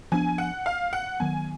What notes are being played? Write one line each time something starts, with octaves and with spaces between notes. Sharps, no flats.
F3 B3 D4 G#5
F#5
F5
F#5
D#3 F#3 B3 G#5